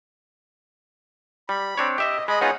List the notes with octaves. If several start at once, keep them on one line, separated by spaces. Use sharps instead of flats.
G3 B5
C4 D4 C#5
G4 D#5 E5 G5
G#3 D#5 B5
B3 D#4 F4 G#4 C#5 F#5